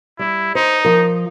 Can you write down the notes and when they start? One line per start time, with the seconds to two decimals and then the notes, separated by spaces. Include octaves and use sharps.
0.19 G3 E4
0.55 D#4 C5
0.85 F3 A#4